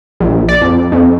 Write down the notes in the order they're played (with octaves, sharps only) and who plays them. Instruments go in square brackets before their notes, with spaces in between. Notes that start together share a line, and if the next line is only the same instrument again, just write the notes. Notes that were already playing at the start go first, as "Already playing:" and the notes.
[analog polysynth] A#1
D5
F2
F2